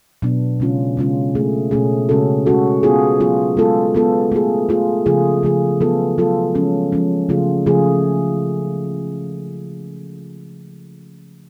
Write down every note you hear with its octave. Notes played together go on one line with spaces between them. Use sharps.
B2 F#3 B3 D4
C#3 G#3 C#4 F4
C#3 G#3 C#4 F4
B2 A3 C#4 G#4
B2 A3 C#4 G#4
C#3 G#3 C#4 F#4 A4
C#3 G#3 C#4 F#4 A4
F#3 B3 F4 G#4
F#3 B3 F4 G#4
G#3 B3 F4 A4
G#3 B3 F4 A4
A3 F4 G#4
A3 F4 G#4
C#3 F3 A3 F4 G#4
C#3 F3 A3 F4 G#4
F#3 B3 F4 A4
F#3 B3 F4 A4
F3 G#3 C#4
F3 G#3 C#4
C#3 F3 A3 F4 G#4
C#3 F3 A3 F4 G#4